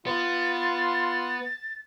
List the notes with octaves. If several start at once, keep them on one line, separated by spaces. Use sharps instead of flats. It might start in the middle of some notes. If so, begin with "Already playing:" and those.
B3 F4 A6